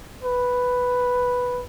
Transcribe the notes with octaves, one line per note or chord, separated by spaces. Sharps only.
B4